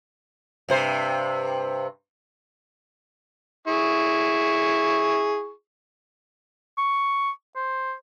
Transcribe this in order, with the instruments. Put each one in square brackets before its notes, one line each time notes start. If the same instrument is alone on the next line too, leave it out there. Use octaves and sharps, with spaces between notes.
[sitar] G2 C3 C5
[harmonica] E4 G#4 C#6
[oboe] C#6
C5